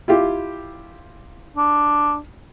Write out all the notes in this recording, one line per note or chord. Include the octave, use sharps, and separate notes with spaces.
E4 F4 G4
D4